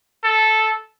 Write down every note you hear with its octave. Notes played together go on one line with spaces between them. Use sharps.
A4